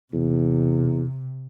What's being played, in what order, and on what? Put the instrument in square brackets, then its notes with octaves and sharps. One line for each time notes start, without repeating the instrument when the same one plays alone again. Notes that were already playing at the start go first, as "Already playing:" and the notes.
[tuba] E2 [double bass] C3